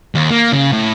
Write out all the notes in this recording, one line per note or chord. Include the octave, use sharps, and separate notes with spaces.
D#2
A#3
C#3
A2